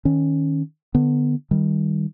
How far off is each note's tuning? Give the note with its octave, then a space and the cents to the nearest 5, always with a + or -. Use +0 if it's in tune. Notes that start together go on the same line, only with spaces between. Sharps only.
D#3 +0 C#4 -5
D3 +15 B3 +0
D#3 +0 G3 +0